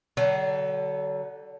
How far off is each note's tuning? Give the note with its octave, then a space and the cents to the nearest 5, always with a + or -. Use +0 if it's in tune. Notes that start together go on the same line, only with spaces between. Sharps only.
D3 +0 F#3 +40